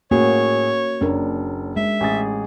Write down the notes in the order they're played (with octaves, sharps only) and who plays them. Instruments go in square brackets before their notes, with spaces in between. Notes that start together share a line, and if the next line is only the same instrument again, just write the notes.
[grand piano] A2 G#4 [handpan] A#3 C#4 F#4 [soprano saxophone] C#5
[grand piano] F#1 [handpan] C#4 D4 A#4
[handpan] G#3 [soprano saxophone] E5
[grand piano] A1 G#4 A6